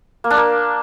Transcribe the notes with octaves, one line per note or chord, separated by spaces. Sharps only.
A#3
D4
A#3